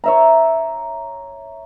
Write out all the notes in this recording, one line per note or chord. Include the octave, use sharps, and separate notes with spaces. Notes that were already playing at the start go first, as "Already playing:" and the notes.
C#5 E5 A#5